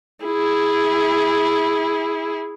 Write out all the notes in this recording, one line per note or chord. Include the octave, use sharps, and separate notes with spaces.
E4 G#4